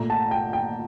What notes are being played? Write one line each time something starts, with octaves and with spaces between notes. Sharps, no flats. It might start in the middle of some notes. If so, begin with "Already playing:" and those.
Already playing: A#2 A3 A#5
A5
G5
G5